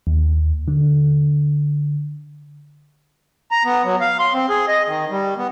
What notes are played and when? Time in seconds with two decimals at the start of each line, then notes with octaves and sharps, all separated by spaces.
0.07 D#2
0.68 D3
3.51 A#5
3.65 B3
3.84 F#3
4.01 F5
4.19 C6
4.34 C4
4.49 G#4
4.68 D#5
4.87 D#3
5.10 G3
5.37 B3